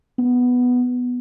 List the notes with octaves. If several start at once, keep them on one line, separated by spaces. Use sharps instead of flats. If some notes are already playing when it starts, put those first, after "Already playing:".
B3